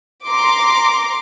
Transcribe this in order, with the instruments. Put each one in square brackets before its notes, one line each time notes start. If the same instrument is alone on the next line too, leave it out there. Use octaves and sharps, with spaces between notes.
[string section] A#5 C6 D6